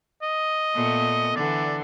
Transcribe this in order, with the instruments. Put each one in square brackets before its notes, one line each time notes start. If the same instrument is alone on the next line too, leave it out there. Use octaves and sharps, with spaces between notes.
[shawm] D#5
[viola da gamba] A#2 A3 B3
[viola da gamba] D3 E3 [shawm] D5